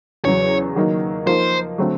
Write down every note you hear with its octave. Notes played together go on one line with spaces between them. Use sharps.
E2 C#3 F#3 C#5
D#3 F#3 A#3 D#4
F3 A#3 D#4 C5
D3 F#3 A3 C4